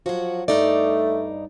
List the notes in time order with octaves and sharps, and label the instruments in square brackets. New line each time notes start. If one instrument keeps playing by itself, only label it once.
[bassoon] F3 [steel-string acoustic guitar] F#3 F#4
[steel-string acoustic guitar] G2 D#4 D5 [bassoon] A3